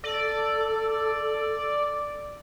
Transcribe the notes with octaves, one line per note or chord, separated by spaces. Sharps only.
A4 D5